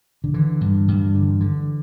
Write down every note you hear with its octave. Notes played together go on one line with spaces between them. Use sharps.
D3
D3 E3
G2
G2
D3
D3